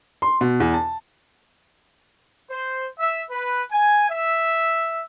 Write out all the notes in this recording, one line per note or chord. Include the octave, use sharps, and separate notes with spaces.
C6
B2
E2
A5
C5
E5
B4
G#5
E5